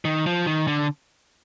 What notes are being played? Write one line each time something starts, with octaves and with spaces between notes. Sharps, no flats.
D#3
F3
D#3
D3